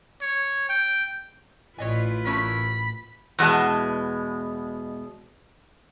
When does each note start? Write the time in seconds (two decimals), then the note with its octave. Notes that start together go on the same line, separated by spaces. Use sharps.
0.22 C#5
0.69 G5
1.78 A1 E4 F4 B4 C#5 D#5 G#5
2.25 A3 C#4 A#4 B5
3.39 E2 B2 G#3 A5